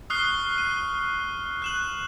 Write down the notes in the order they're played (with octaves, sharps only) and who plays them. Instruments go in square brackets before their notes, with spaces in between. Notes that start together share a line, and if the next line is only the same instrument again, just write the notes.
[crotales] C#6 D#6 F6 F#6 C7 G7
D#7
F#6 E7 F#7